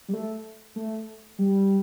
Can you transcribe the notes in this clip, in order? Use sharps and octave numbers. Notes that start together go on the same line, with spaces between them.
G3
A3
A3
G3